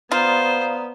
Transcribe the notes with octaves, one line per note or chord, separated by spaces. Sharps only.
B3 F4 C5 D5 A#5 D#6